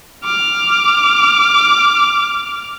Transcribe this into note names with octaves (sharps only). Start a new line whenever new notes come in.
D6 F6